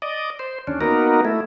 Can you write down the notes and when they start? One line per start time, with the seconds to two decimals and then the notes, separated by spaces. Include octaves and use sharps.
0.02 D5 D#5
0.39 C5
0.67 D#2 C#4 D4
0.81 A#3 B3 D#4 F#4 A#4
1.25 A3 E4